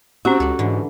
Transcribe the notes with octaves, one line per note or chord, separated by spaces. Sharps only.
C4 C#4 F#4 G4
C#2 A4 D5
G#2 D3 E3